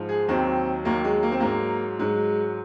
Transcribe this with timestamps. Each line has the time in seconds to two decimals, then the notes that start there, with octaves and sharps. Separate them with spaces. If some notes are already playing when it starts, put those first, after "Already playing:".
Already playing: G#2 F3
0.09 G#4
0.28 D#2 D#3 F#3 C4
0.85 D#2 D#3 F#3 A#3
1.04 G#3
1.23 A#3
1.32 C4
1.40 G#2 F#3 A#3
1.99 G#2 F#3 G#3